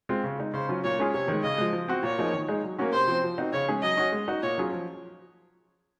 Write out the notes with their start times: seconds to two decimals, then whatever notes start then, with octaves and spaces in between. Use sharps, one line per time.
0.09 G#3 C4 F4
0.24 C#3
0.39 G#3 D#4
0.53 C#3 C5
0.69 F#3 C#4 F4
0.84 A#2 C#5
0.99 G#3 C#4 F4 G#4
1.14 C3 C#5
1.28 D#3 G#3
1.43 C#3 D#5
1.58 F3 G#3
1.73 F3
1.88 C4 F#4
2.03 A#2 C#5
2.18 F3 A#3 D#4 G#4
2.33 D#3
2.48 G#3 D#4 G#4
2.63 F#3
2.78 A#3 C#4 F#4
2.93 C3 C5
3.07 F3 C4
3.24 F3
3.38 C4 D#4 F#4
3.53 C#3 C#5
3.68 G#3 C#4 G#4
3.83 F#3 D#5
3.97 C#4 F#4
4.12 G#3
4.28 D#4 F#4
4.43 A#2 C#5
4.58 F#3 C#4 F4 G#4
4.73 F3